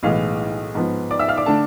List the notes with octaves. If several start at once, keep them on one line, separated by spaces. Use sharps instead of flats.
B1 A2 E3 G#3 F5
G#2 F3 B3
D5 D6
E5 E6
F5 F6
D5 D6
D3 A3 D4 A4 A5